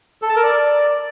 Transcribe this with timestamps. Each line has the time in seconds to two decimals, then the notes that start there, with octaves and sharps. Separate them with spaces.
0.22 A4
0.29 A5
0.36 A#4
0.43 D5